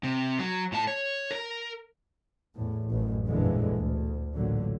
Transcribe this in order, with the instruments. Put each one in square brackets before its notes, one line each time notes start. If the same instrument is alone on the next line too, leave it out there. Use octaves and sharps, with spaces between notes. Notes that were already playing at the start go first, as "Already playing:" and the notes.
[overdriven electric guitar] C3
F#3
A2 A5
C#5
A#4
[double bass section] E2 A2
A1 F#2 A2
G1 F2 A#2 D3 E3 G#3
D2
A1 A#2 D3 F#3